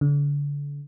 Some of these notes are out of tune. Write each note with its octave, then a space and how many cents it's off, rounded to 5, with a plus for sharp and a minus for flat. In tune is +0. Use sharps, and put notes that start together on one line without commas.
D3 -35